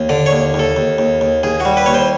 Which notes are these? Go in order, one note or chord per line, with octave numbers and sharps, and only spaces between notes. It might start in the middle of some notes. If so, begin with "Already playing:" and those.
Already playing: D#2
D3 D5
C#5
D#2
D#2
A4
D#2
D#2
D#2
D#2 G#4
F#4
G3
B4
D#2 C#5
C5